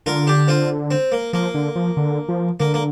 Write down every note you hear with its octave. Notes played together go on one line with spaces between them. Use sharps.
D3 F4 A#4
D4 G4
C4 F4
C4
A#3
F3 A#3
D3
F3
D3
F3
D3 A#3
A#3